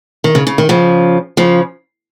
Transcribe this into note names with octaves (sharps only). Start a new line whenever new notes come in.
D#3
C#3
C#3
D#3
C#3 F3
C#3 F3